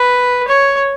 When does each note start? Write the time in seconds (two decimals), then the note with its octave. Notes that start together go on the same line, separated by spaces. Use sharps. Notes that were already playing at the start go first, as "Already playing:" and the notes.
Already playing: B4
0.48 C#5